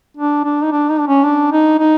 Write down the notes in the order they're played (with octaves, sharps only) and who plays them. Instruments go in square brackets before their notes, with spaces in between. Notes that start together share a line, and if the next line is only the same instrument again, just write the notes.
[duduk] D4
D4
D#4
D4
D#4
D4
C#4
D4
D#4
D#4